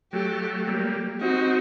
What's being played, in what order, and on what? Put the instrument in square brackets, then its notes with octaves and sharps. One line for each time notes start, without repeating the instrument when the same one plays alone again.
[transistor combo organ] F#3 A3 [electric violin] G4
[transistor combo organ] G3 A#3
[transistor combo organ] C4 D#4 [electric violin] F#4